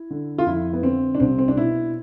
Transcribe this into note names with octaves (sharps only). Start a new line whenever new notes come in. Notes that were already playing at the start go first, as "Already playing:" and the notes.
Already playing: E4
D3
F4
F2 E4
B3
D3 C4
D4
C2 C4
C4
D4
B2 E4